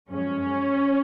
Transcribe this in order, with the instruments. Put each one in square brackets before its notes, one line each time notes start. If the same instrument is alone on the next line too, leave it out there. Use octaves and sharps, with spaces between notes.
[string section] F#2 F3 G#3 C#4